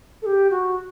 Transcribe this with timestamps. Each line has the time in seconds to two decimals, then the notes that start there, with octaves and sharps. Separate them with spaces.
0.22 A4
0.26 G4
0.50 F#4